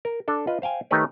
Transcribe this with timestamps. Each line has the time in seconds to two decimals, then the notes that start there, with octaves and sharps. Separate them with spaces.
0.05 A#4
0.28 D4 A4
0.47 F4 B4 D#5
0.62 C5 F5 G5 G#5
0.91 D#3 A3 D#4 G4 B4 C#5